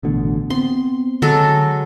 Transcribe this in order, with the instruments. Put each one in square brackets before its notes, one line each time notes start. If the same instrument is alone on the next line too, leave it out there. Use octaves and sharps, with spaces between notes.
[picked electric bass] A1 B2 D3
[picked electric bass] B3 C4 [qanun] C6
[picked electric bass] D3 [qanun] F#3 G#3 A4